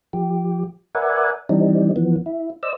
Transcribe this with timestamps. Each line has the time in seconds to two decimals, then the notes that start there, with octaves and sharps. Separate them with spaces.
0.13 F3 G4
0.95 A#4 B4 D5 E5 F#5 G#5
1.49 E3 G3 C4 D4 D#4
1.96 E3 F3 B3
2.26 E4
2.63 C5 D5 D#5 E6